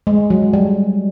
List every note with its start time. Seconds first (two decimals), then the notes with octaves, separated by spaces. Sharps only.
0.07 G#3
0.30 F#3
0.53 G3